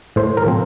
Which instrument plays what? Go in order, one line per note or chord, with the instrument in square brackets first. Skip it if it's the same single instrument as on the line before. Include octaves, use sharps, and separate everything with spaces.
[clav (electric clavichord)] A2 C5
A#4
F3 C4